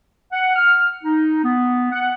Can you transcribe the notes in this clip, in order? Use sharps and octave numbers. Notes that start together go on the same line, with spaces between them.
F#5
F6
D#4
B3
F#5